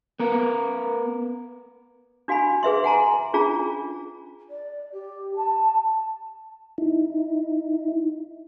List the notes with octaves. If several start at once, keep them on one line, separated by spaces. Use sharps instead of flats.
B3 A#4
D4 F#4 F5 G#5 B5
G#4 B4 E5 C6
F#5 G#5 A#5 C6
C#4 D4 F4 G#4 A#5
D5
G4
A5
D#4 E4